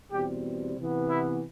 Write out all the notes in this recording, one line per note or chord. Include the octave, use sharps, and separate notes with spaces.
E2 B2 G3 C4 G4
C3 E3 B3
E4